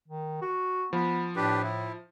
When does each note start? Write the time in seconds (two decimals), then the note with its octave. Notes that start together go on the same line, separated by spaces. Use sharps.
0.08 D#3
0.41 F#4
0.93 F3 B3
1.36 A2 D4 G4 B4
1.63 E4